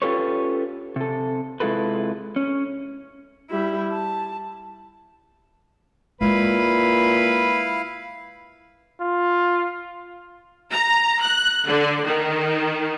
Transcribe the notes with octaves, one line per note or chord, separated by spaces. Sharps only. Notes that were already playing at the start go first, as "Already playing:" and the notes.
C#4 F4 G4 A4 B4 C#5
C3 A4
C3 G#3 E4 F4 A4 B4
C#4
G3 E4
A5
A#2 G#3 E4 B4 F5
F4
A#5
F#6
D3
D#3